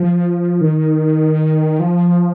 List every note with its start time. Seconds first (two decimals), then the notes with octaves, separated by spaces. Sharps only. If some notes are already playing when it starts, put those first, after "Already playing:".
Already playing: F3
0.61 D#3
1.80 F3